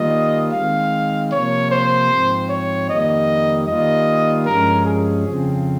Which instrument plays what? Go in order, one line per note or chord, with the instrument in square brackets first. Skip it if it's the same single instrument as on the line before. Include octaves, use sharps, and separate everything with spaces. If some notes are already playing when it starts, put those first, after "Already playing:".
Already playing: [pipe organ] D#3 G3 A#3 F4 [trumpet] D#5
[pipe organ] D#3 G#3 C4 [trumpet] F5
[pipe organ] C3 F3 A#3 [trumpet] C#5
[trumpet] C5
[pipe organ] G#2 F3 C4
[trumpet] C#5
[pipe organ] F2 D#3 G3 A#3 [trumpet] D#5
[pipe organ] D#3 G3 A#3 F4 [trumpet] D#5
[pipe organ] G2 F3 G#3 C#4 [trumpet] A#4
[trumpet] G#4
[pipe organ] F2 C#3 F3 C4